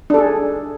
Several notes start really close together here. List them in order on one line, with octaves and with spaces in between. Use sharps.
D4 A4 G#4